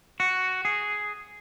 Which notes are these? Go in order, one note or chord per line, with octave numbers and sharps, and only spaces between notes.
F#4
G#4